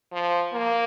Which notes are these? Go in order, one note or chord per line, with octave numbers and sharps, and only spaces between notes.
F3
A#3